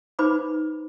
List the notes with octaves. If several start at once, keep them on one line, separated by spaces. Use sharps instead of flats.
D#4 B4 C5 B5 D6